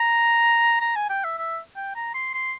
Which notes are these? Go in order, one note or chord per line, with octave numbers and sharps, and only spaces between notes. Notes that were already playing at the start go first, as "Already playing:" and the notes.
Already playing: A#5
A#5
G#5
G5
E5
E5
G5
A#5
C6
C6